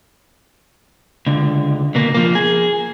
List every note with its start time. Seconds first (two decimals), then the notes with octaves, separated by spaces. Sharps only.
1.26 C#2 D3
1.95 B2 A#3
2.14 F3 A#3
2.35 G#4